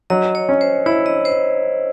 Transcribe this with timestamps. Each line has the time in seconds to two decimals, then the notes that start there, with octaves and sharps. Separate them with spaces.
0.10 F#3 D#5
0.35 C#5
0.49 C#4
0.61 C5
0.86 E4 C#5
1.06 D#5
1.25 C5